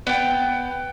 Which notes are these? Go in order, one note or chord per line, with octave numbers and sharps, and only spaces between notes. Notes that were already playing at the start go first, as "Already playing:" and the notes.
B3 G5